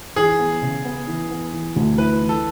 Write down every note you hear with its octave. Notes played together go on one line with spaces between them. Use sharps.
E3 G#4
B3
C#3
B3
E3
B3
E3
D2
E4 B4
E3
A4